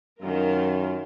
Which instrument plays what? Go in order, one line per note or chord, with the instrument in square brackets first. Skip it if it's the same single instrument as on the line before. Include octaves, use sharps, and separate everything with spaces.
[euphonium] F#2 [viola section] D#3 F4 A#4